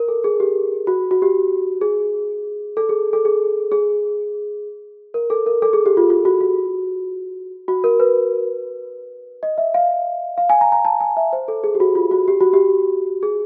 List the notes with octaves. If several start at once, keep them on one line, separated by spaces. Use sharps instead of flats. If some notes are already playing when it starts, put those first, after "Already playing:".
Already playing: A#4
A4
G#4
G4
F#4
F#4
G4
G#4
A4
G#4
A4
G#4
G#4
A#4
A4
A#4
A4
G#4
G4
F4
F4
F#4
F#4
F#4
A#4
B4
D#5
E5
F5
F5
G#5
A#5
A#5
A5
G#5
E5
C5
A4
G#4
G4
F#4
F4
F#4
G4
F#4
G4
G#4